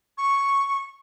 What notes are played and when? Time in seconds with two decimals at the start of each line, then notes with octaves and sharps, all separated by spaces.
0.18 C#6